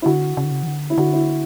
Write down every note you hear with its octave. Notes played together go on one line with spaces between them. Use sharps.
E4
D3 F#4
C#3
D3
C#3
E3
D3
E4
D3 F#4
E4